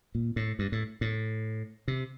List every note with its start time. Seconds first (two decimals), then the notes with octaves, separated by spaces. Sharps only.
0.15 A#2
0.36 A2
0.59 G2
0.72 A2
1.01 A2
1.88 C3